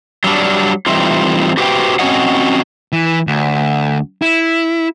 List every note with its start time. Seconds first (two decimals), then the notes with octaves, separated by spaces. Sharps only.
0.24 F#3 G3 D4
0.86 E3 G3 A3 C4 D#4 F4
1.57 F#4 G4 B4 C5 F#5 G5
1.99 C4 C#4 F#4 C#5 D#5 F#5
2.92 E3
3.27 D2
4.22 E4